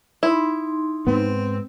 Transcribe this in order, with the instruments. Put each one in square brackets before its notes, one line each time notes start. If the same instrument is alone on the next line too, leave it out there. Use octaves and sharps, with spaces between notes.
[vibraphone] D#4 C6 [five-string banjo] E4
[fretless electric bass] G#2 B3 [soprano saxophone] C4